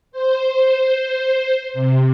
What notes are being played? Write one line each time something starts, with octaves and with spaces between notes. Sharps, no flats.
C5
C3